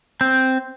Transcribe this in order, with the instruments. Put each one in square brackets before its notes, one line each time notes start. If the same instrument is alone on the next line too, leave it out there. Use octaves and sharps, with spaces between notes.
[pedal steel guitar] C4